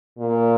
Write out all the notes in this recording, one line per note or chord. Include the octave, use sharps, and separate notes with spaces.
A#2